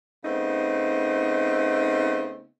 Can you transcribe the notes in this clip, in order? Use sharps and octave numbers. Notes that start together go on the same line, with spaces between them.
C#3 A3 B3 C4 D#4